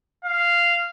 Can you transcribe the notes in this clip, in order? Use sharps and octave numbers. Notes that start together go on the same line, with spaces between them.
F5